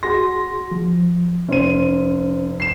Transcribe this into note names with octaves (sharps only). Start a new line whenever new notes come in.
F#4 G#4 C6 A#6
F3
F1 C#4 C5 D#7
C7 E7